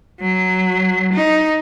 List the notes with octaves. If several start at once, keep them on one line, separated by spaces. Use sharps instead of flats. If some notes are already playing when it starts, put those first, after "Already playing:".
F#3
D#4